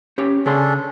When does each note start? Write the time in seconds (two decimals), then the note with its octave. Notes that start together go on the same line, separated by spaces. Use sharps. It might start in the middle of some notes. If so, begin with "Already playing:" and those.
0.18 C#4 G4 C#5
0.46 C#3 C#4 D4 G#4 A4 C6